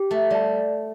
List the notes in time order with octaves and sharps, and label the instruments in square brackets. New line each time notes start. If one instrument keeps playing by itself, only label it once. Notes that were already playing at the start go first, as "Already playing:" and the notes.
Already playing: [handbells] G4
[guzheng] A3
[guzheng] G3 [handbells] D5 A5